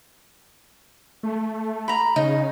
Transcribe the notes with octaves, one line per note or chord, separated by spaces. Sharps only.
A3
A#5 B5
C#3 D#4